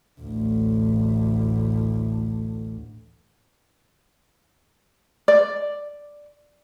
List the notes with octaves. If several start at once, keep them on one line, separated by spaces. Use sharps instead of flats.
A1 D2
D5